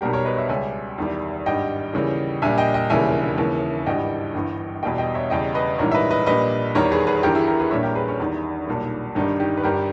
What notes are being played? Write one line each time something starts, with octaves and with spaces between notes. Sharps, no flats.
B1 B2 G3 G4 A#4
A#4 C#5
B4 D#5
C#5 E5
C#2 C#3 G3 E5 G#5
E2 D#3 G3
G#1 G2 G3 D#5 G5
D#2 C#3 E3 G3
A#1 A#2 G3 E5 G#5
D#5 G5
D#5 G5
E1 D#2 C#3 E3 G3 E5 G#5
D#2 C#3 E3
G#1 G2 E3 G3 D#5 G5
G1 G2 E3
E2 B2 G3 D#5 G5
D#5 G5
C#5 E5
E2 C#3 G3 D#5 G5
B4 D#5
A#1 G#2 E3 G3 A#4 C#5
E5
B4 D#5
B4 D#5
A#1 A#2 G3 B4 D#5
E2 D#3 G3 A#4 C#5
G#4 B4
G#4 B4
G1 G2 E3 G4 A#4
E4 G#4
G4 A#4
G#4 B4
A#1 A#2 G3 C#5 E5
G4 A#4
G#4 B4
C#4
E2 D#3 G3 D#4
B1 A#2 G3
G1 G2 D#3 G3 D#4
D#4 G4
B4
G1 G2 G3 G4 A#4